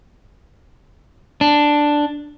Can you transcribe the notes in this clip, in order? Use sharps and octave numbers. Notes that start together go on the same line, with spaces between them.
D4